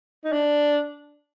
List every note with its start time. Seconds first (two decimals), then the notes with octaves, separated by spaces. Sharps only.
0.25 D#4
0.32 D4